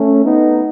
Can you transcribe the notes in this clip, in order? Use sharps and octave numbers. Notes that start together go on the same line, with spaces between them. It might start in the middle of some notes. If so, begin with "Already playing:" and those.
Already playing: A3 C#4
B3 D#4